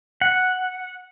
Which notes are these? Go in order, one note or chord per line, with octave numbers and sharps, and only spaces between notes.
F#5